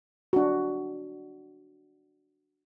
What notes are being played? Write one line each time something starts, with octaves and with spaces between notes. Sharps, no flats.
D4 F#4